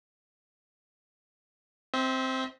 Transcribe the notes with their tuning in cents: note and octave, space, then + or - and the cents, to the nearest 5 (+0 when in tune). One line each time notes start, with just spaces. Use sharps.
C4 +0 E5 -40